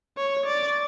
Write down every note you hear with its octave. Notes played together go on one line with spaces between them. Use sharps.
C#5
D5